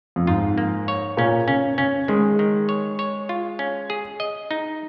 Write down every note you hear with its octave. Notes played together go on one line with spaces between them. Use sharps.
F2
G#2 F4
A#3
C#5
A#2 C#4
C#3 C#4
C#3 C#4
D#3 G#3
D#3
C#5
C#5
F4
C#4
G#4
D#5
D#4